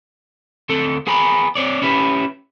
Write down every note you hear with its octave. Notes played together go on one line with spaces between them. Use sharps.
D2 C4 A4
B3 G#4 G#5 A#5 B5
C4 C#5 D5
C#4 E4 G4 B4